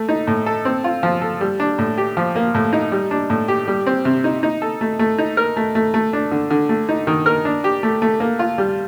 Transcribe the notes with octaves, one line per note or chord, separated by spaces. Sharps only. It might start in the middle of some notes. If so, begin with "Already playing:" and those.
Already playing: A3
D#4
A2
A4
C4
F4
F3
A4
G3
D4
A2
G4
F3
A#3
A2
D#4
G3
D4
A2
G4
G3
C4
C3
D#4
D#4
A4
A3
A3
D#4
A#4
A3
A3
A3
D4
D3
D3
A3
D#4
D#3
A#4
D4
G4
A3
A3
A#3
F4
G3